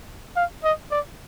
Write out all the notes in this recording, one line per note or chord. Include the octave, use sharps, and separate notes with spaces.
F5
D#5
D5